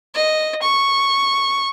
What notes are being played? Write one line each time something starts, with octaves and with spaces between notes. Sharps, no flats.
D#5
C#6